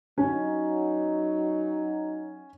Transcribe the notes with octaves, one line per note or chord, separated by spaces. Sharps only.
F#3 C#4 D#4